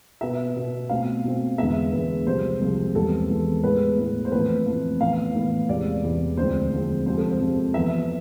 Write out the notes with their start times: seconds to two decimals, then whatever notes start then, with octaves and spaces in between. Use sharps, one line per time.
0.21 B2 B3 E5
0.56 B2 B3
0.90 B2 A3 C4 F5
1.24 B2 A3 C4
1.58 E2 D3 G#3 B3 E5
1.93 E2 D3 G#3 B3
2.27 C2 C3 F3 G#3 C5
2.61 C2 C3 F3 G#3
2.95 E2 C3 E3 G#3 B3 A4
3.30 E2 C3 E3 G#3 B3
3.63 A2 G#3 B3 B4
3.98 A2 G#3 B3
4.25 C5
4.32 F2 E3 A3 B4
4.66 F2 E3 A3
5.00 A2 E3 B3 F5
5.35 A2 E3 B3
5.69 E2 C3 E3 G#3 D5
6.03 E2 C3 E3 G#3
6.37 D2 D3 F3 G#3 C4 C5
6.72 D2 D3 F3 G#3 C4
7.05 F2 C3 F3 G#3 C4 C5
7.17 A4
7.29 C5
7.40 F2 C3 F3 G#3 C4
7.74 F2 E3 B3 E5